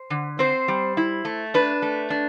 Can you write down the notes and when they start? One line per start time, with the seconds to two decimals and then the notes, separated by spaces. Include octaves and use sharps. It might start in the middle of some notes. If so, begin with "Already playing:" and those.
Already playing: C5
0.10 D3
0.39 C4 C5
0.68 G3
0.97 E4
1.25 A3
1.54 D4 B4
1.82 A3
2.10 D4